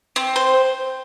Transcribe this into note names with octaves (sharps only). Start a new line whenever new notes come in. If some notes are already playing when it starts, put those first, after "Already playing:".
C4
C5